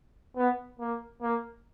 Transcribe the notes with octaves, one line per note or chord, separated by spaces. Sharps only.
B3
A#3
A#3